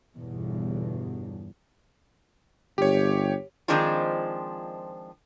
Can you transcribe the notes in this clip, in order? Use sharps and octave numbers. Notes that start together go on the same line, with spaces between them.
G1 E2 B2
G1 G4 C#5
D#3 F3 G#3 C4 D4 F4